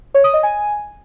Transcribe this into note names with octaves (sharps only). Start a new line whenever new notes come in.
C#5
D#6
D#5
G#5